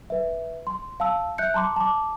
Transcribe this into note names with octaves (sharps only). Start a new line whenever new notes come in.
B4 E5
C6
F5 A5 E6
E5 F#6 G6 C#7
A5 A#5 C6 D6
A5 D6